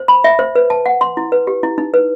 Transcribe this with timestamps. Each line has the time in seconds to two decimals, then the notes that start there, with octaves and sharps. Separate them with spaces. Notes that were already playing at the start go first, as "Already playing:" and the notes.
Already playing: C5
0.08 B5
0.24 E5
0.39 C5
0.56 B4
0.70 A5
0.86 F#5
1.01 C6
1.17 E4
1.32 B4
1.47 G4
1.63 E4
1.78 D#4
1.94 B4